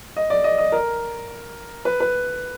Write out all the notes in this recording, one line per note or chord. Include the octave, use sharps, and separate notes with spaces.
D#5
D5
D#5
D#5
A#4
B4
B4